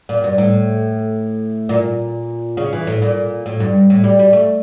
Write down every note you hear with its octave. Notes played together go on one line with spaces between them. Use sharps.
A#2
G2
A2
A#2
C#3
E3
A2
A#2
A2
G2
A2
G3
G3
A3